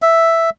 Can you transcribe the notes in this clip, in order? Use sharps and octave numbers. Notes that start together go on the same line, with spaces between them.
E5